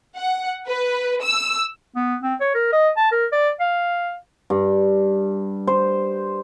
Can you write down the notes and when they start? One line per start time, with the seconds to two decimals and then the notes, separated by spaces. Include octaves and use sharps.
0.16 F#5
0.67 B4
1.22 E6
1.96 B3
2.23 C4
2.41 C#5
2.55 A#4
2.73 D#5
2.97 A5
3.12 A#4
3.32 D5
3.60 F5
4.50 G2
5.67 C5